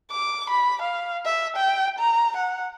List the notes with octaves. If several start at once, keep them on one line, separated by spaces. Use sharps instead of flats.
D6
B5
F5
E5
G5
A#5
F#5